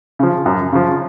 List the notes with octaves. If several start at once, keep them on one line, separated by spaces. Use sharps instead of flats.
C#3 F3
F#2
C#3 F3